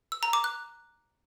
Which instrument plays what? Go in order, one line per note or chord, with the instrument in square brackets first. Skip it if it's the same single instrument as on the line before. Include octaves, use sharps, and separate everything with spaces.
[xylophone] E6
A#5
D6
F#6